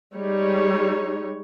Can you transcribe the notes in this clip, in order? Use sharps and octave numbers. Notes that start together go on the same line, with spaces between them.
G3 G#3 D#4 C#5